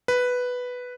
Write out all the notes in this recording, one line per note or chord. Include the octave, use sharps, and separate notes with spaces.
B4